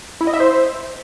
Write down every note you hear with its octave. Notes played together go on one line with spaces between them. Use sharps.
E4
D#5
E5
C5